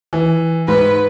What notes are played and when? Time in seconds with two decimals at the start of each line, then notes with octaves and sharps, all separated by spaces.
0.13 E3
0.68 G#2 B4